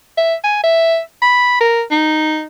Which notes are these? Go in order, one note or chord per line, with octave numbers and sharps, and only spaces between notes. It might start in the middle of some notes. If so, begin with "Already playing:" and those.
E5
G#5
E5
B5
A#4
D#4